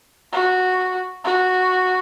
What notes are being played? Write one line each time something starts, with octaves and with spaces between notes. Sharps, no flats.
F#4
F#4